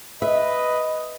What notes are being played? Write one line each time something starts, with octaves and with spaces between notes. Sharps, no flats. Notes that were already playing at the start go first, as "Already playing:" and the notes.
B4 D#5 E5